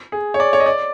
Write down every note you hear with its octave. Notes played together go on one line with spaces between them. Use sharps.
G#4
C#5
D5
C#5
D#5
D5